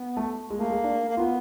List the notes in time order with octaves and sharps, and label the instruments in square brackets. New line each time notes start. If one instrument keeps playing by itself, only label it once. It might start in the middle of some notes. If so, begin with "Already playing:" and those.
Already playing: [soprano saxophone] B3
[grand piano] A3
[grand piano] G#3 [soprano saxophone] A#3
[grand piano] A3
G#3
D4
[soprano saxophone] A#3
[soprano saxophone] B3 [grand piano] F4